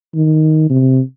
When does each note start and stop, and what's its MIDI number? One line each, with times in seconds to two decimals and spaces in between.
0.14 0.69 51
0.70 1.00 48